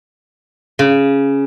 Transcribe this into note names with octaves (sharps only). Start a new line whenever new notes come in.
C#3